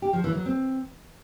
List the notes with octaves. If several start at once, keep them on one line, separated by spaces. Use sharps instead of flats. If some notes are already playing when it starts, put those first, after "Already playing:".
G4
F3
E3
F#3
C4